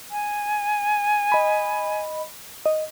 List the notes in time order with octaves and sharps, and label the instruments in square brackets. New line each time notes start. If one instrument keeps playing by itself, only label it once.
[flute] G#5
[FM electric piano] D#5 B5
D#5